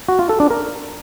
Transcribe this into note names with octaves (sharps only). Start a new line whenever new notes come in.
F#4
F4
A4
D4
A#4